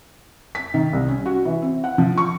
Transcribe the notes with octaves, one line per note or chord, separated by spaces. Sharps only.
B6
D#3
C2
C#4
F#4
E3
C4
F#5
F3
C#6